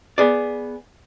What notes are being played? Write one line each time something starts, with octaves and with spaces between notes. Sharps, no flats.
B3 G#4 D5